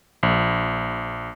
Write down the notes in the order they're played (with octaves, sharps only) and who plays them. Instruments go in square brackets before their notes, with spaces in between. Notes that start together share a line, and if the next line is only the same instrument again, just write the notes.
[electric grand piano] A#1